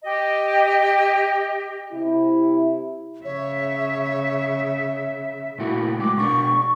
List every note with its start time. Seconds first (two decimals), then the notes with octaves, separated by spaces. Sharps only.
0.03 G4 D#5
1.93 C3 E4
3.25 C#3 C#5 E5
5.58 A#2 A3 E4 F#4
6.00 F#3 G#3 F#4 D6
6.17 B2 D4 C#6